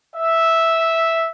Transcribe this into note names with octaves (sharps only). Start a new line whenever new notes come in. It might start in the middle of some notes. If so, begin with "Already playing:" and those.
E5